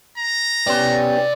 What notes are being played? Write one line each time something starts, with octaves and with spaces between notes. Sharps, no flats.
A#5
B3 C#4 G4 D5 C6